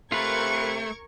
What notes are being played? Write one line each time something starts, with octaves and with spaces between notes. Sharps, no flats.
C3 A3 F4 A#4 B4 C#6 G#6